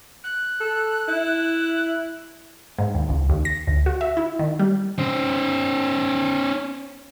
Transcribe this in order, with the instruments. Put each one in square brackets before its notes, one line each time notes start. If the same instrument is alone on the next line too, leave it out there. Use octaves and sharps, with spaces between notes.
[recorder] F#6
[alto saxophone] A4
E4
[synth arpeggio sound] G#2
D#2
C#2
D#2
A#6
D2
F#4
E5
E4
D#3
G3
[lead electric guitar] C#4 C5